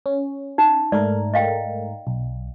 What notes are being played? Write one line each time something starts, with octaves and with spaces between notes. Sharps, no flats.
C#4
D#4
G#2 A3 A#4 D5
D#5 F5 G5
B1